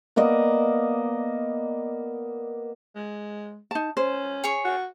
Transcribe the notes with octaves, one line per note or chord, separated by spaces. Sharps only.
A#3 B3 D5 D#5
G#3
D#4 A5
C#4 C5
G#4 C#5 C#6
F#4